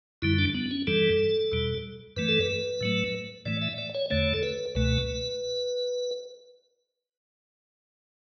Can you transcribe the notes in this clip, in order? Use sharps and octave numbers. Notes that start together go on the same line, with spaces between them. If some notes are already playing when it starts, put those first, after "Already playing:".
F#2 D3 G3 E4
D4
B3
C#4
G2 E3 G3 A4
E2 B2 G3
G2 E3 A3 B4
A4
B4
A2 F#3 A3
A2 E3 A3 D5
E5
D5
C#5
E2 D3 A3 C#5
A4
B4
C#2 B2 A3 B4